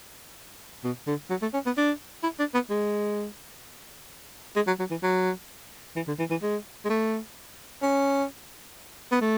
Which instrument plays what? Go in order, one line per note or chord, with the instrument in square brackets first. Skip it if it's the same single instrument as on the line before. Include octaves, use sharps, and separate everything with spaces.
[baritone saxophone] B2
D3
F#3
A3
C#4
B3
D4
E4
D4
B3
G#3
G#3
F#3
F#3
E3
F#3
E3
D3
E3
E3
G#3
G#3
A3
C#4
B3
A3